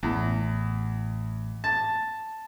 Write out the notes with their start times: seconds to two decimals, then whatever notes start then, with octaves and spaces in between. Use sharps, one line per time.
0.03 A1 E2
1.64 A5